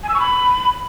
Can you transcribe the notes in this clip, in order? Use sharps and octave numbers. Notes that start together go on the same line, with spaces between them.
G#5
E6
C#6
B5